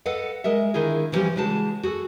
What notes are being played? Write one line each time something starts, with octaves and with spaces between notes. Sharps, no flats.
A4 B4 D#5 F5 F#5
G#3 A#4 D#5 E5
D3 D#3 E4 F4 G#4
D3 E3 F3 G3 C#4 G4
C#3 E3 G#3 F#4 A5
F#4 G#4 A4